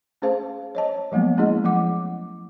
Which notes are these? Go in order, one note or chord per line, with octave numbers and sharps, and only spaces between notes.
A3 C#4 G#4 C5 F5 A5
C#5 D#5 A5
F3 F#3 G#3 A#3 B3
G#3 A3 C#4 E4 G#4 D#5
F3 F#3 A3 F#5 D6